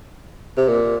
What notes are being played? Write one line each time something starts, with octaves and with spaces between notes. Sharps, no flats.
C3
A#2